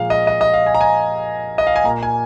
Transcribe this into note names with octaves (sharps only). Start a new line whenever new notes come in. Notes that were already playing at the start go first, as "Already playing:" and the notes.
Already playing: A#2 F3 G#3 F5
D#5
D#5
D#5
F5
G#5
A#5
G#5
D#5
F5
G#5
A#2 A#3 A#5
G#5